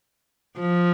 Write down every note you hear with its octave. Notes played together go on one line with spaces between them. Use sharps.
F3